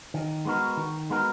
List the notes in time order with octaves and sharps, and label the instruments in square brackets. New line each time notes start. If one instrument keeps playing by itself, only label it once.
[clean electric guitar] D#3
G#3 B3 F#4 A#4
D#3
G#3 B3 F#4 A#4